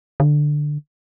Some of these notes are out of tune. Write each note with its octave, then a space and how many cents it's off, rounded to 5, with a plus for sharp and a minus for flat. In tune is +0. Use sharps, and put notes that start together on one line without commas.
D3 +10